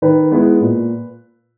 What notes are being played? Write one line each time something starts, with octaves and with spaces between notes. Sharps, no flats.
D#3 B4
G#3 B3 E4
A#2